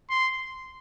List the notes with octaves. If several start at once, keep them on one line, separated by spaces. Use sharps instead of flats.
C6